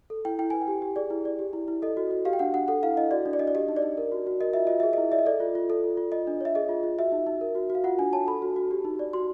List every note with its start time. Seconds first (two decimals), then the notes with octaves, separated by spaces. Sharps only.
0.10 A4
0.25 E4 G5
0.39 E4 G5
0.50 B4 G#5
0.62 G5
0.68 G4
0.82 G4
0.96 G#4 D5
1.10 E4
1.25 D5
1.39 G4
1.53 E4
1.68 E4
1.82 A4 D#5
1.97 F#4
2.11 F#4
2.25 G4 F5
2.33 G5
2.39 D4 F#5
2.54 D4 F#5
2.68 A4 F#5
2.83 E4 F5
2.97 E4 D#5
3.11 F#4 D5
3.26 D4
3.33 D5
3.39 D4 D#5
3.47 D5
3.55 G4 D#5
3.68 D#4
3.76 D5
3.82 D#4
3.97 A#4
4.12 F#4
4.27 F#4
4.41 A#4 D#5
4.53 F4 E5
4.67 F4 D#5
4.80 G#4 E5
4.93 E4 D#5
5.12 D5 E5
5.19 D#5
5.26 A4 D5
5.40 F4
5.55 F4
5.70 A4
5.84 F4
5.97 F4
6.12 F4 D#5
6.27 D4
6.41 C#5 E5
6.55 G#4 D#5
6.69 F4
6.83 F4
6.98 F#4 E5
7.12 D#4
7.27 D#4
7.41 A#4
7.55 F#4
7.70 F#4
7.75 F5
7.84 F4 F#5
7.99 D4 G#5
8.13 C#5 A5
8.27 A4 B5
8.42 F#4
8.56 F#4
8.71 G4
8.85 D#4
8.99 D5
9.13 F#4 C6